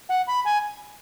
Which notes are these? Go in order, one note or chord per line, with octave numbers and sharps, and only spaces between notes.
F#5
B5
G#5